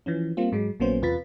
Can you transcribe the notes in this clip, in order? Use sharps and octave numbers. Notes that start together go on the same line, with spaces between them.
E3 F3 C#4
G3 A#3 C4 F4
G#2 F#3 G#3
A#1 F#3 A#3 B3 C#4 C5
E2 C3 F4 B4 A6 B6